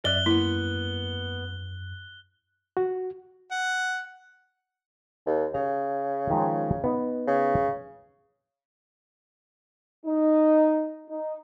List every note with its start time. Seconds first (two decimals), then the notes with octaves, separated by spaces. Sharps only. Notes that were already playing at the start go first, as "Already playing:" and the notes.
0.05 F#2 D5 E5 F#6 G7
0.26 A#3 B3 E4
2.77 F#4
3.51 F#5
5.27 D#2
5.55 C#3 A#5
6.30 D#3 F3 G#3
6.84 B3 D#4
7.27 C#3
10.06 D#4
11.08 D#4